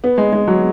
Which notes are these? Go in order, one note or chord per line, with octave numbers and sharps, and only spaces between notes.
B3
G#3
G#3
F#3